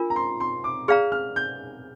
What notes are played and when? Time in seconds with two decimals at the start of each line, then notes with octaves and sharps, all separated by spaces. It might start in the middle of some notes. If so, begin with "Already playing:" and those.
Already playing: D4 F4 A#4
0.10 A#5
0.16 C6
0.40 C6
0.64 D6
0.88 G#4 D5 F5 A#5 F6
1.12 F6
1.36 G6